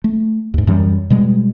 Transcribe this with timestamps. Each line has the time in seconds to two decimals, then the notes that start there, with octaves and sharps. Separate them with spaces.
0.04 A3
0.54 D#2 G#2
0.67 F#2 E3 F#3 G3
1.10 B2 G3 G#3